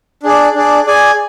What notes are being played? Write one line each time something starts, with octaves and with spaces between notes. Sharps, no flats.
D4 G#4 D5
D4 G#4 D5
G#4 D5 G#5